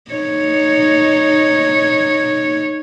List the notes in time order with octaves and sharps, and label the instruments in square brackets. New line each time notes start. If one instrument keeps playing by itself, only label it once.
[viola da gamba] D#4 C#5